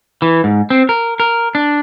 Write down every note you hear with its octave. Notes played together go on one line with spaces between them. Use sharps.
E3
G#2
C4
A#4
A#4
D4